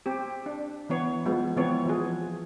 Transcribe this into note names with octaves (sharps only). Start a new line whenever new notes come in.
C4 G4
D4
E3 B3 C#5
F3 G#3 B3
E3 B3 C4 C#5
F3 G#4